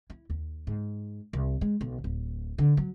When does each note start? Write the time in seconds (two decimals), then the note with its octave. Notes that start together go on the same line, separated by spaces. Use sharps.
0.10 E4
0.30 D#2
0.67 G#2
1.33 C2
1.61 G#3
1.81 B1
2.04 D1
2.58 D3
2.77 F#3